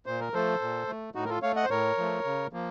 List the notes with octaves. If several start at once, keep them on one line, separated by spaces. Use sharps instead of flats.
A#2 C5
A#4
F3 A3 A4 C5
A#2
A3
A2 D#4 F#4
A#4
F4 A4
A3 C#5 F5
D#5 F#5
C5
A2 A#4 C#5
F3 A3
C#3
F3 A#3